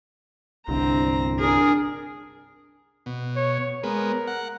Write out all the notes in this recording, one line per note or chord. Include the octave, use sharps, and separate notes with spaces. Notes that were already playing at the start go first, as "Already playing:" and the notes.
G1 C2 G2 C4 A#5
D4 G#4 A#4
B2
C#5
G#3 B3 A#4
F#5